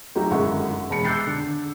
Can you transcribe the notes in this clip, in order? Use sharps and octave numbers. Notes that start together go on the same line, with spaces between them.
F#3 G3 A3 D#4 F#4 G4
G1 F#2 G#3 E4 F#5 C#6
E1 G#3 A5 B5 C#7
D6 E6 F#6 G6 A6 C7
D3